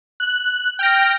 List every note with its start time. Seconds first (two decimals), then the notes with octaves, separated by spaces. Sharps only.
0.20 F#6
0.79 G5 F6 A#6